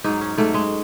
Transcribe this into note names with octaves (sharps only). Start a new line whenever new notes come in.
G#2 F#3 D#4
C#4
G#2 F#3 A3
G#3